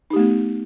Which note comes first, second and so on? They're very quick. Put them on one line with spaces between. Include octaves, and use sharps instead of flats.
D#4 G4 A3 B3